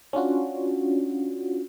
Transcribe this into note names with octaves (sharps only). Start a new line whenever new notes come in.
C#4 D4 F4 F#4